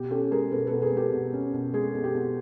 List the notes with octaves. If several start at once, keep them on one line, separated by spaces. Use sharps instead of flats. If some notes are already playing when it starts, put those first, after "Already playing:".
Already playing: B2 G4
C#4 G4 A4
G#3 G#4 A#4
B2 A4 B4
B2 A4 B4
G#4 A#4
G#3
G4 A4
B2
C#4
B2
G#3 G#4
B2
G4
B2